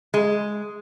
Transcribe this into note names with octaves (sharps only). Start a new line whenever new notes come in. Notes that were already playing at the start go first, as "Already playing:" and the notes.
G#3